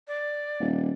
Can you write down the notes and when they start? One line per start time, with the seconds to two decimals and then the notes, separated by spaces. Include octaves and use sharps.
0.08 D5
0.60 D#1